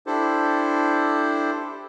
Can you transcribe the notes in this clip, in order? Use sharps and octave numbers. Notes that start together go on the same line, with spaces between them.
D4 E4 G4 A4 C5